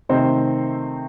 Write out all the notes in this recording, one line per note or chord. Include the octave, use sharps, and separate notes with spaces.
C3 D#3 A3 C4 D#4 C5